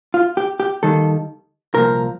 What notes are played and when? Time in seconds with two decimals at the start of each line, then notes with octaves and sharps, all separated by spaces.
0.14 F4
0.37 G4
0.60 G4
0.83 D#2 D#3 G3 A4
1.74 C2 A#2 F3 A#4